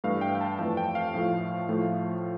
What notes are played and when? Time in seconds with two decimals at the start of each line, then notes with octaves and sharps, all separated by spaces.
0.04 G2 E3 A3 F5
0.21 G5
0.35 G5
0.41 A5
0.59 F2 E3 A3 A5
0.77 G5
0.95 F5
1.14 A2 F3 A3
1.69 A2 F3 A3